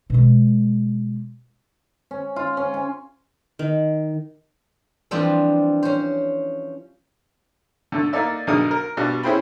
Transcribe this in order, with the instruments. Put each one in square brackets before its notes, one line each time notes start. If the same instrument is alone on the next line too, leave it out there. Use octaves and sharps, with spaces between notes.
[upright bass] B2 G#3
[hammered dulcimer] C#4
F4
C#4
G#5
[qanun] D#3
[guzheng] E3 F3 G3 C4 D4 F4
C#4 C5
[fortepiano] D3 A3 A4
A#3 D#4 A4 D5 E5
B1 D3 D#4 G#4 A#4 D#6
A#4
B2 G3 D4 F4
C#4 E4 G#4 C5 G5 B5